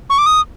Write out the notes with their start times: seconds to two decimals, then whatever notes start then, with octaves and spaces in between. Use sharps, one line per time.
0.10 C#6
0.18 D6
0.26 D#6